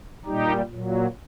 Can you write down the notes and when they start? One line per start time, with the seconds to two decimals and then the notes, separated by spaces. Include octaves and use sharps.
0.26 A#2 G3 D#4 G4
0.71 A#2 F#3